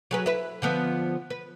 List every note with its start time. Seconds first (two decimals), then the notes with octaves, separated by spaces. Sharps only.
0.11 F#3 G#4 B4
0.26 E4 B4
0.62 D3 F3 B3
1.30 B4